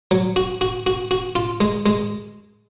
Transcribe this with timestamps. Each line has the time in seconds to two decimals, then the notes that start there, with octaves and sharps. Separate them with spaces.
0.11 F#3
0.36 F#4
0.61 F#4
0.87 F#4
1.11 F#4
1.36 F4
1.61 G#3
1.86 G#3